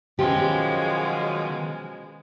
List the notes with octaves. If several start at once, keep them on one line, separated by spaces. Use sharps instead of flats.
B2 D#3 F3 F#3 G#3 C#4 G4 C6